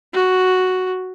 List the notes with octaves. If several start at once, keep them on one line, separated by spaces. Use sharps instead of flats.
F#4